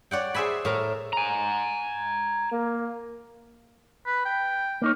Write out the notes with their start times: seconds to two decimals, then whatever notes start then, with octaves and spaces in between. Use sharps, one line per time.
0.11 C#5 D5 F#5 G5
0.34 G#4 C5 E5 G#5 B5
0.65 A2 A#4 A#5
1.13 G#5 A#5
2.52 A#3
4.06 B4
4.25 G5
4.82 A#3 D#4 C#5